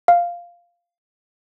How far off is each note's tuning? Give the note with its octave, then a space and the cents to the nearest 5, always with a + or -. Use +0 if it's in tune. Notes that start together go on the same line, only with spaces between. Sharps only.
F5 -5